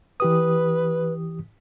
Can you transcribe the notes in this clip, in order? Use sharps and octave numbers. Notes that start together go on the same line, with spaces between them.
E3 G4 B4 D#6